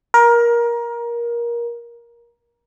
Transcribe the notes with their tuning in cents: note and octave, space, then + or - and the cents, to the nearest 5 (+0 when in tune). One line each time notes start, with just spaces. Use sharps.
A#4 +20